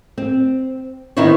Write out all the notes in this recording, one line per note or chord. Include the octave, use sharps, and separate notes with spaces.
C4
D#3 B3 D#4 E4 C5 C#5